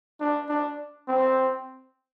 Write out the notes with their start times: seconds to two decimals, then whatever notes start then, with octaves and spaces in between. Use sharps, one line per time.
0.20 D4
0.49 D4
1.08 C4